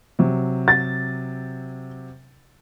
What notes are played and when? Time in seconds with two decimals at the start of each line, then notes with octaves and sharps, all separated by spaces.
0.19 C3 F#3
0.68 A6